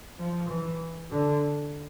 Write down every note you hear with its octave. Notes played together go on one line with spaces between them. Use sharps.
F3
E3
D3